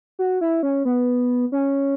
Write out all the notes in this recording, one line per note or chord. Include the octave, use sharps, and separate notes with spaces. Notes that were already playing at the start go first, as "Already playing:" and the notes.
F#4
E4
C#4
B3
C#4